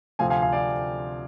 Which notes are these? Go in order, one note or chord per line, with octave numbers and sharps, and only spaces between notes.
D2 C3 F3 C4 F5 G#5
F5 G#5
F5 G#5
D5 F5